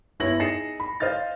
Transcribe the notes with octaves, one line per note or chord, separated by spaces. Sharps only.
G1 B3 E4 C#5 A#6 F#7
D#4 G#4 A#6 C7 C#7 E7
B5
C5 D#5 F5 F6 A6